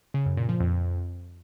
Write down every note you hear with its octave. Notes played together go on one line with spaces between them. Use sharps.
C#3
F#2
A#2
F3
F2